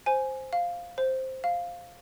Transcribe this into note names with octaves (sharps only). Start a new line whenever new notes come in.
C5 G#5
F5
C5
F5